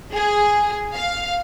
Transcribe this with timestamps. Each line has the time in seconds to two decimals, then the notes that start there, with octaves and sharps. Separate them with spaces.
0.14 G#4
0.93 F5